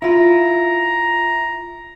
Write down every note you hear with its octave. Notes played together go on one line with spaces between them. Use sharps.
E4 F4 A#5